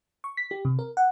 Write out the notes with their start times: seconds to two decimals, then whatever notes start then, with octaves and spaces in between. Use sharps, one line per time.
0.24 C#6
0.37 B6
0.51 G4
0.65 C3
0.79 A#4
0.97 F#5